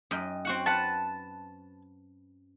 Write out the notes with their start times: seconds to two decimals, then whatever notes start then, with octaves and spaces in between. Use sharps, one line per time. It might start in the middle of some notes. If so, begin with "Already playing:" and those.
0.11 F#2 D#5 G5
0.45 C4 F#4 F#5
0.66 B4 F#5 A5